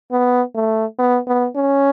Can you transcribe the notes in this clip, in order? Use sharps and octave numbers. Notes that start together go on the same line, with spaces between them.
B3
A3
B3
B3
C#4